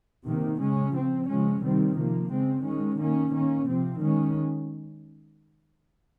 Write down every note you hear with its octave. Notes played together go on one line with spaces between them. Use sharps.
C3 D#3 A#3
C#3 G#3 C#4
F3 C4
C#3 F3 G#3 C#4
C3 D#3 G3 C4
C3 F3 A#3
C#3 G#3 C4
D#3 G#3 C#4
D#3 A#3 C#4
D#3 A#3 C#4
C3 F3 C4
D#3 G#3 C#4